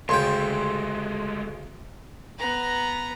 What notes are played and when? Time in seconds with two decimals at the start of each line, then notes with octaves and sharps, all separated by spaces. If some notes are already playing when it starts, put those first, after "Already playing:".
0.09 D2 C#3 G#3 A3 G5 C6
2.39 B3 A#5